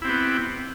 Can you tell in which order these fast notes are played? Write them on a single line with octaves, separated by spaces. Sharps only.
E4 C4 G4 B3